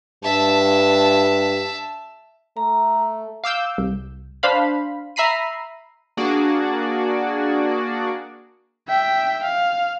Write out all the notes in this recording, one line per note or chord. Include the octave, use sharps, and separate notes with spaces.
G2 E5 A5
A3 A#5
F5 D6 E6 G6
C2
D4 C5 F5 B5
E5 A#5 B5 C7 D#7
A#3 D4 F#4 G#4 D5
E5 G5
F5